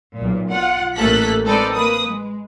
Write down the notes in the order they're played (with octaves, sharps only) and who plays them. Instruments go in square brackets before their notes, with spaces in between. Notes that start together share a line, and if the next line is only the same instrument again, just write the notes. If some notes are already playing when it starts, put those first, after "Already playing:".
[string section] B1 A#2
F4 F#5
A1 A3 A#3 A4 F#6 B6
G#3 C4 D#4 A4 B4 D5
A#3 B4 D#6
G#3